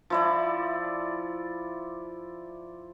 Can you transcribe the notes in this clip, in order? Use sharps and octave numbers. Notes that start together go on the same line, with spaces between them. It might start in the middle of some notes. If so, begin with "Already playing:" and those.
F3 E4 D5